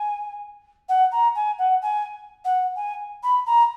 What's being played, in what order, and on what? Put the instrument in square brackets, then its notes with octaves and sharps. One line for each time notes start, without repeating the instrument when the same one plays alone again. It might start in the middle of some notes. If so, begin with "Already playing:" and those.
Already playing: [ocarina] G#5
F#5
A#5
G#5
F#5
G#5
F#5
G#5
B5
A#5